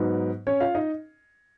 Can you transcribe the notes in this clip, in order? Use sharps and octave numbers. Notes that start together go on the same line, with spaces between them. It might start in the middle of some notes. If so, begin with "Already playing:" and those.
Already playing: G#2 F#3 B3 D#4
C#4 C#5
F4 F5
D#4 D#5